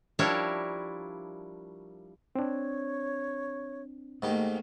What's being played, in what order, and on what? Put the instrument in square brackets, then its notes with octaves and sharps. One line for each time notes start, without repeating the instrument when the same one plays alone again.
[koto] F3 G3 D4 E4 A#4 C#5
[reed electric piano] C4 D4 [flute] C#5
[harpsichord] G#2 D#3 G4 [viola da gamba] A3 A#3